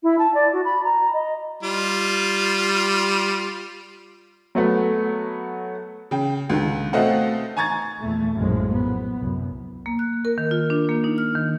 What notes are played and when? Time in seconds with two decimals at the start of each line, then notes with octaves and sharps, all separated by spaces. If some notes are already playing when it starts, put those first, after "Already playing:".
0.03 E4
0.19 A5
0.34 D5
0.53 F#4
0.65 B5
0.84 A#5
1.13 D#5
1.63 G3 F4
4.55 F#3 A3 B3
6.11 C#3 G5
6.50 C#2 D3 D#3
6.93 B2 A3 C4 D#5 F5 F#5
7.57 G#5 A#5 C#6 G#6 A6
8.00 E2 A#2 A3
8.34 A#1 F#2 A2 F3 G#3
8.73 B3
9.20 C2 F#2
9.86 A#3
9.99 F#6
10.25 A#4
10.38 D#3
10.51 F4
10.70 D4
10.89 A#3
11.04 D#4
11.18 F6
11.35 D#3